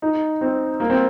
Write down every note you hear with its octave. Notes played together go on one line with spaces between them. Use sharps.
D#4
C4
A#3
C4